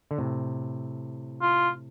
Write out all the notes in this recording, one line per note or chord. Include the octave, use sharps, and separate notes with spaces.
D3
A2 C3
F4